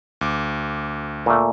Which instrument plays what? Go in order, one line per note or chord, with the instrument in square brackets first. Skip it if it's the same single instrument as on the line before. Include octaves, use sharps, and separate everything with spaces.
[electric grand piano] D2 D6
[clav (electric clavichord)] A#2 A3